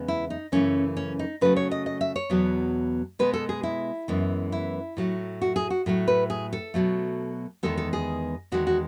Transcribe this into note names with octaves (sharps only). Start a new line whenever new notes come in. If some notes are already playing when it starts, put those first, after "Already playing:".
Already playing: E2 C#3 G#3 B3
E4
D#4
F#2 C#3 E3 A3 C#4
C#4
D#4
C#3 F#3 A3 B4
C#5
D#5
D#5
E5
C#5
E2 B2 F#3 B3
B2 G#3 B3 B4
A4
G#4
E4
F#2 E3 G#3 B3
E4
A2 F#3 A3
F#4
G#4
F#4
A2 F#3 A3
B4
G#4
A4
B2 F#3 A3
E2 D#3 G#3 B3 A4
A4
G#4
E2 D#3 G#3 F#4
F#4